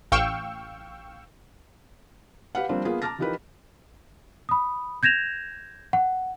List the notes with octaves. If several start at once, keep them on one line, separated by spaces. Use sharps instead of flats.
A1 F5 G5 C#6 E6
G4 B4 F5 F#5
F3 G3 A#3 C4 D4
A#3 B3 F4 G#4
A5 A#5 D6 F6 A6 A#6
E3 F3 D#4 G4 A#4 B4
B5 D#6
G6 G#6 A#6 E7 F7
F#5